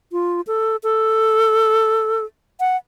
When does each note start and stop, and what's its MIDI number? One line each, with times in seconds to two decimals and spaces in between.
0.12 0.41 65
0.47 0.76 69
0.83 2.24 69
2.60 2.76 78